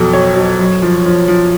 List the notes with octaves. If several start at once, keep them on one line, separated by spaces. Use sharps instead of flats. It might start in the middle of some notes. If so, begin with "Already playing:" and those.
Already playing: F2 B2 F#3 A4
F#3 C#5
F#3
F#2
F3
F3
F3